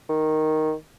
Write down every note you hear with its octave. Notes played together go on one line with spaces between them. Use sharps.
D#3